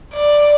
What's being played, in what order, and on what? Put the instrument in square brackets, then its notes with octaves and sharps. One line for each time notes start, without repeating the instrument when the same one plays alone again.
[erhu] D5